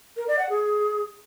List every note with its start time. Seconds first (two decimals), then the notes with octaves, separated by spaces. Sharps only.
0.17 A#4
0.28 D5
0.39 F#5
0.50 G#4